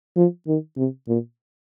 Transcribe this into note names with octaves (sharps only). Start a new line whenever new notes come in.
F3
D#3
C3
A#2